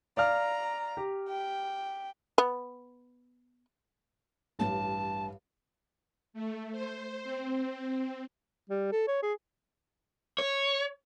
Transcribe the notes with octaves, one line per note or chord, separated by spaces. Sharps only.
D5 F5 A#5 F6
G4
G5
B3
A1 G2 A5
A3
C5
C4
G3
A4
C#5
G#4
C#5